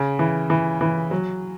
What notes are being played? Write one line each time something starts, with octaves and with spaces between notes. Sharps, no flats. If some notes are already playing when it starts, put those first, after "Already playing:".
Already playing: C#3
E3
E3
E3
F#3